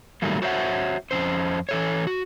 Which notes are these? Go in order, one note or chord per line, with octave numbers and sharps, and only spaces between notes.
A2 D#3 F#3 G3 A3 A#3
F#4 C5 C#5 E5 F#5
F2 C#3 C#4 C5
E3 A4 C#5
F#4